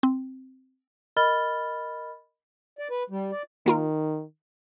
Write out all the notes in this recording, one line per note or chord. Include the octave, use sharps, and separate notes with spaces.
C4
A#4 D#5 B5 F6 A6 G7
D5
B4
G3
D5
D#3 A#3 F4 A#4